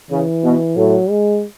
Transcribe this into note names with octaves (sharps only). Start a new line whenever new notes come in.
C#3 E3
B2
A2 F#3
G#3